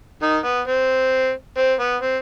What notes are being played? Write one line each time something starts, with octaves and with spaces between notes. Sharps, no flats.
D#3 D#4
B3
C4
C4
B3
C4